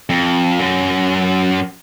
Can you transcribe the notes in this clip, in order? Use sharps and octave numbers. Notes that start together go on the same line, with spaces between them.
F2
F#2